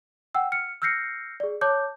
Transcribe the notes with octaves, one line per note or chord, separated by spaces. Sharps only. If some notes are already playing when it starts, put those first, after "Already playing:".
F#5 G5 E6
F6 C#7
E6 F6 G6 A#6 C7 C#7
G#4 D5
C#5 A5 D6 G6